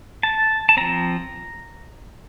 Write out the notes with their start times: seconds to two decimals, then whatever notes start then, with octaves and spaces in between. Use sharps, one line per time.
0.23 A5
0.69 A5
0.77 F3 C4 A#5